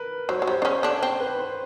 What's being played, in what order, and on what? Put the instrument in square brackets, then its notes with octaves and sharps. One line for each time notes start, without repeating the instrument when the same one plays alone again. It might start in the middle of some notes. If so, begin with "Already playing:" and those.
Already playing: [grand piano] A#4 B4
[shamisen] F#3 [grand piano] C5
[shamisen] F#3 [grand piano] C#5
[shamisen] G3 [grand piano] C5
[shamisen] D4
C#3 C#4
D3 D4
[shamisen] C4 [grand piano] C5
[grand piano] B4
C5